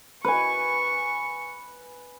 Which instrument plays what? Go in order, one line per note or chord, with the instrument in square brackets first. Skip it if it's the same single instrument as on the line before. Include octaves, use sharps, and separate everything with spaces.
[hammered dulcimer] B4 G#5 [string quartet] C#6